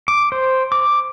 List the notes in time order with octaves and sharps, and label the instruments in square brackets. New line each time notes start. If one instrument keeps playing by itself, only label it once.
[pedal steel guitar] D6
C5
D6